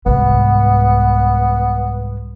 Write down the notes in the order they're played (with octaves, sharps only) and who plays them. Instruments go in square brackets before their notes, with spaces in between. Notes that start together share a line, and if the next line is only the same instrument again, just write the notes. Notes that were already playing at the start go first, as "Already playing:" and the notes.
[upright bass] C2 G#2 [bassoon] B3